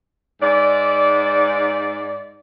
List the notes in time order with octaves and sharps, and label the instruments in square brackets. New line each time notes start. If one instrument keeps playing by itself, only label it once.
[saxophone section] G#2 D5